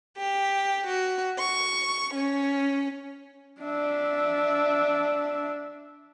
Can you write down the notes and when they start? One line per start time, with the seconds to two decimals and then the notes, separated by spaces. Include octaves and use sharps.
0.16 G4
0.87 F#4
1.38 C#6
2.14 C#4
3.61 D4 E5